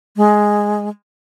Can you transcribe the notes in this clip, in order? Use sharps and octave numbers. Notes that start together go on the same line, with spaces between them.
G#3